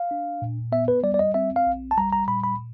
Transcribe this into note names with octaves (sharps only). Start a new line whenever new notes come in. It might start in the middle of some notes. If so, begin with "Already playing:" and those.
Already playing: F5
D4
A#2
B3 E5
B4
G3 D5
D5
D#5
C4 E5
F5
A#1
A5
G3 A#5
A#5
A#2 B5
B5